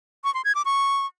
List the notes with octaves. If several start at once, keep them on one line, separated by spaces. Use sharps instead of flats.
C#6
C6
G#6
D6
C#6